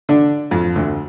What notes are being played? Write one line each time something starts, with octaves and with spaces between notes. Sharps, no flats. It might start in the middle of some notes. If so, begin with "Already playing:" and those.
D3 D4
F2 F3
D2 D3